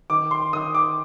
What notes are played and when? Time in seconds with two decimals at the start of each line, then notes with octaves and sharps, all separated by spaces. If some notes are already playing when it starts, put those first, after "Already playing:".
0.10 D#3 D6
0.31 C6
0.53 D#3 D#6
0.74 D6